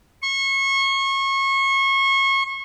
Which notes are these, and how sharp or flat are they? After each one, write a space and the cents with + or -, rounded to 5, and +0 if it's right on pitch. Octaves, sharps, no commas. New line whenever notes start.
C#6 -30